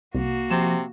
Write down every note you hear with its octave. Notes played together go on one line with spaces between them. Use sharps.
C2 A#3 F#4
C3 F3 E7